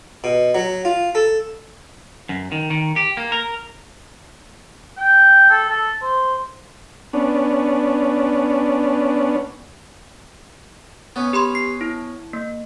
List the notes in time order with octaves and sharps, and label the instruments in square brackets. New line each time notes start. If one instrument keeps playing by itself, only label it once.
[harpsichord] B2
F#3
F4
A4
[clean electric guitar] F#2
D#3
D#3
G4
A#3
A#4
[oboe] G5
A4
A4
C5
[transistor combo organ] B3 C#4 D4
[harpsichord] B3 C#4
[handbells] G4 B5 C6
C7
E4
A#3